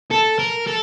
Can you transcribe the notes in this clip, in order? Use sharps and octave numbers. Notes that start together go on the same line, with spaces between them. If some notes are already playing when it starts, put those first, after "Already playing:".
A4
A#4
A4